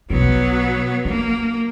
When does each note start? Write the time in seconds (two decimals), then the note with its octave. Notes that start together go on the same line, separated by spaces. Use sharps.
0.10 B1 F#3 B3 D#4
1.05 A#3 D4